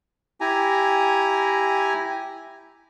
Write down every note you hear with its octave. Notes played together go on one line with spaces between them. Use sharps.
E4 G4 G#5 A#5